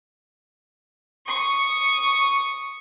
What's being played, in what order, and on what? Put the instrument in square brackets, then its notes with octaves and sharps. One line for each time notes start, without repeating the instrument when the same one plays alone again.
[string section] C#6 D#6